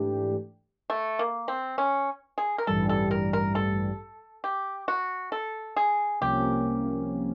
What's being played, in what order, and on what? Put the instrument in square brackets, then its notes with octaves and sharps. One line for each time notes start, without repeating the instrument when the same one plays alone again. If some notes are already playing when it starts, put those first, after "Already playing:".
Already playing: [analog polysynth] G#2 E3 A3 D4 G4
[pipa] A3
A#3
C4
C#4
G#4
A#4
[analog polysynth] A1 G2 E3 G3 [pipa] A4
[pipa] A4
A#4
A#4
A4
G4
F#4
A4
G#4
[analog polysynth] C2 C3 F3 A#3 C#4 [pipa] G4